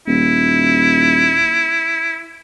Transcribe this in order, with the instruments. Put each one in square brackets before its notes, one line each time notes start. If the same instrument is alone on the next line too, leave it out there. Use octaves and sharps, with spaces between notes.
[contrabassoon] D#1 [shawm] E4